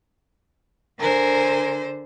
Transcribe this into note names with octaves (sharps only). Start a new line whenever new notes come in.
D3 A#4 C5 G#5